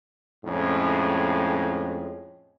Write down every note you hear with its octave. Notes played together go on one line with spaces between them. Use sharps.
F2 A2 G#3 C#4